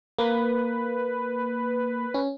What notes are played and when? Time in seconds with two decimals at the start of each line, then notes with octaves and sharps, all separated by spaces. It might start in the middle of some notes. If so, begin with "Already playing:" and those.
0.19 A#3 B4
2.14 C#4